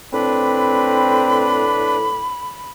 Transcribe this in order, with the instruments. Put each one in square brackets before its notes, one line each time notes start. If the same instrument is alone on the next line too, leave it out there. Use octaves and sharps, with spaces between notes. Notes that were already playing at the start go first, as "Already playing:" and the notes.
[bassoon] A2 [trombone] C4 [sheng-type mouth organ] D4 B4 [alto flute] B5